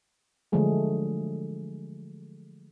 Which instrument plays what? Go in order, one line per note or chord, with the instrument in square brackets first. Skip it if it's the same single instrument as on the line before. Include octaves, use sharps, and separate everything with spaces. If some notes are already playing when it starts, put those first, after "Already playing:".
[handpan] D3 F3 F#3 G#3 A3 G#4